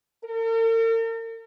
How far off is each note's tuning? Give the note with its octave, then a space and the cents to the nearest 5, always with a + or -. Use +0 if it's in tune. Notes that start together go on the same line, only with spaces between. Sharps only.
A#4 -45